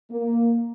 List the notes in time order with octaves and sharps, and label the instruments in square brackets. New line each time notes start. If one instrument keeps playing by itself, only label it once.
[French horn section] A#3